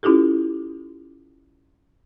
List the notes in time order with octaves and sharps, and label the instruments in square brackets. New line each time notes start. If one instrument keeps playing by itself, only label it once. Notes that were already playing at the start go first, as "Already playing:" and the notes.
[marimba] C#4 E4 F4 G4 A4